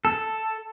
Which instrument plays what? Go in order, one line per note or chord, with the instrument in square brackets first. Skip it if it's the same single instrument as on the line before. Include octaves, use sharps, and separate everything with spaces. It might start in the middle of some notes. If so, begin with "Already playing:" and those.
[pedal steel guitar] A4